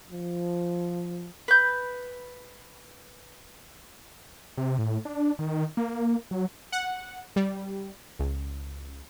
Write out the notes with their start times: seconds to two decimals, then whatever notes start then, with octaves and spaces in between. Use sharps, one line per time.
0.11 F3
1.48 B4 G6
4.57 C3
4.79 A2
5.05 D4
5.39 D#3
5.77 A#3
6.31 F#3
6.72 F#5
7.36 G3
8.19 C#2